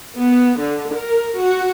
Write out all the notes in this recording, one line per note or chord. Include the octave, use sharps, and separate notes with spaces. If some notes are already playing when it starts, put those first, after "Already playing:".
B3
D3
A#4
F#4